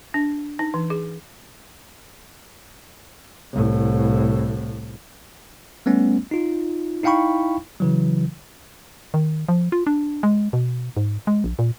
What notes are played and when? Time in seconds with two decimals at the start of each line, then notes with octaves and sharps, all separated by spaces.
0.14 D4
0.59 D#4
0.74 E3
0.90 G#4
3.52 C2 A2
5.86 G3 A3 B3 C#4
6.31 D#4 F4
7.03 D#4 E4 F5 G5 B5 C#6
7.80 C#3 E3 F#3
9.14 D#3
9.48 F3
9.72 F4
9.87 D4
10.23 G#3
10.53 B2
10.97 G#2
11.27 G#3
11.44 A#1
11.59 A#2